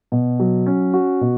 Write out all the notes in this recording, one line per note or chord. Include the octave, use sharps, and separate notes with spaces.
B2
F#3
C#4
F#4
B2